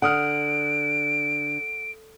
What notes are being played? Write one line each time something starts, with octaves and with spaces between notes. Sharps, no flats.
D3 F#5 D#6 F6 D7